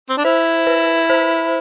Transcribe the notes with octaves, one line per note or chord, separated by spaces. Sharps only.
C4
D4
E4 C5
B4
C5